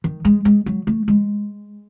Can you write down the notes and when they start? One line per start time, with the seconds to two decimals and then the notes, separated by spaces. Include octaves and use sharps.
0.04 D#3
0.25 G#3
0.45 G#3
0.66 F#3
0.87 A3
1.08 G#3